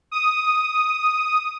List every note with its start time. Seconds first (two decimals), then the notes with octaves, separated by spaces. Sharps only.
0.11 D#6